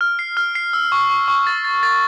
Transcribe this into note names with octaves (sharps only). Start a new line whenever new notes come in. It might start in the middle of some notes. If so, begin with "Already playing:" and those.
F6
C7
F6
C7
E6
C#6
C#6
C#6
A6
A6
A6